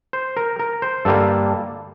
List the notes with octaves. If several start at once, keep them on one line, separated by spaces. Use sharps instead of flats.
C5
A#4
A#4
C5
G2 D3 G3 A#3 A4